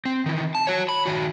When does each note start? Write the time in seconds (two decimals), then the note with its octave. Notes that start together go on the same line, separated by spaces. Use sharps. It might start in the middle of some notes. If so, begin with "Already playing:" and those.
0.05 C4
0.26 D#3 E3
0.55 A5
0.67 F#4 C#5
0.89 B5
1.06 D#3 F#4